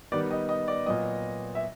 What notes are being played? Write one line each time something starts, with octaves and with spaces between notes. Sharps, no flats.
D#3 G3 B3 D5
D#5
D#5
D5
A#2 F#3 B3 D#5
E5